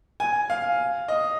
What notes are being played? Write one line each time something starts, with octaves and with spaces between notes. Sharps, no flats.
G#5
F5
D#5